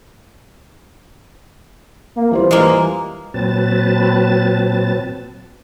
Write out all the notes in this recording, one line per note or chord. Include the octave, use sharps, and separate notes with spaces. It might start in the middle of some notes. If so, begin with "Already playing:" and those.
A#3
E3 G3 F4 C5
G#3 A#3
A#2 F#3 C4 B4 A5 A6